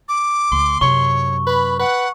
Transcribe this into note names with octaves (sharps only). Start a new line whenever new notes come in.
D6
D2 C6
F#2 C3 C#5 C#6
B4 B5
B4 F#5